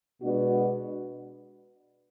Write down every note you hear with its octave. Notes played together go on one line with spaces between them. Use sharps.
B2 G#3 B3 D4 F#4